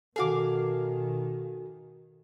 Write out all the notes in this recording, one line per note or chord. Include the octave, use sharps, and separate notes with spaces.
B2 D#3 F#4 G#4 A4 F5 D6